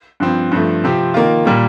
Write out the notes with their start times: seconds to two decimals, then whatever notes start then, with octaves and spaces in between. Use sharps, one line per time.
0.20 G2 F3 C4
0.52 G2 F3 A3
0.84 C3 F3 C4 G4
1.14 D#3 A#3 F4
1.46 A#2 G3 A#3